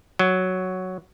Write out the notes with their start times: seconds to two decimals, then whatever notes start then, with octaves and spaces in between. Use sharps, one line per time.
0.19 F#3